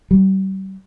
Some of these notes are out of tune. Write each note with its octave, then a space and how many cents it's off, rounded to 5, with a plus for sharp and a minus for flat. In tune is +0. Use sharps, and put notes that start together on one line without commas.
G3 -35